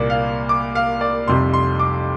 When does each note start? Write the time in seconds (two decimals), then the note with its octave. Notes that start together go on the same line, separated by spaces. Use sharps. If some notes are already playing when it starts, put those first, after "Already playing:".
Already playing: C2 A#2 A#3 D5
0.10 F5
0.49 D6
0.75 F5
1.01 D5
1.27 F1 F2 C3 G3 C6
1.54 C6
1.79 D6